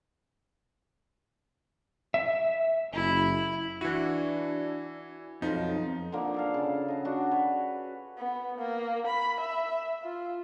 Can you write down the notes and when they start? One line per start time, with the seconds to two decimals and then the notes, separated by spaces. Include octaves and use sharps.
2.14 E5
2.93 F#1 E4
3.81 E3 D4 E4 F#4
5.42 B1 F2 F3 D#4
6.12 D3 F3 A#3
6.34 G#4 A4 F5
6.54 C#3
6.88 D#5 F#5
7.05 D4 F#4 A4
7.31 B4 C#5
8.18 B3
8.58 A#3
9.06 B5
9.40 E5
10.03 F4